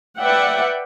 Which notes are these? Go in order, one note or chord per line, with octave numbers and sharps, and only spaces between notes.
B4 D5 E5 F#5 G5